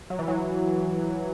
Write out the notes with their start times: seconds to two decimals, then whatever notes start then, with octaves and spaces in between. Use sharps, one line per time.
0.10 F#3
0.19 E3
0.28 F#3